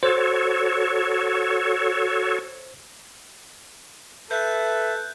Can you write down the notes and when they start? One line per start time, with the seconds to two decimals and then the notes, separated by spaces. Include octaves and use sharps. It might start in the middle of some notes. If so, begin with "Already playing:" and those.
0.03 F#4 A4 C5 C#5
4.31 A4 B4 E5 F#6 G6